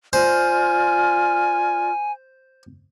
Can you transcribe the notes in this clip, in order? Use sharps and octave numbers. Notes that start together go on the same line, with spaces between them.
F4 C5 D5 G#5 F6